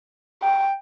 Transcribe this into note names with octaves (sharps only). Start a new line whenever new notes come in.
G5